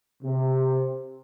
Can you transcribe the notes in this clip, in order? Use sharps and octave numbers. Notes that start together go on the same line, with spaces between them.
C3